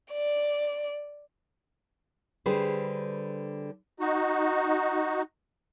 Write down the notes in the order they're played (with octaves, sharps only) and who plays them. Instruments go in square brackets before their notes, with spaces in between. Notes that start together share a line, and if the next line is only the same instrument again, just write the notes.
[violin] D5
[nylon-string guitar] D3 G3 G#4 B4 C5
[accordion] D#4 F#4